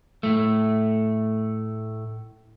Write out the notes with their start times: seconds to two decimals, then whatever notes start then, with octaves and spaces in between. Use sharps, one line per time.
0.23 A2 A3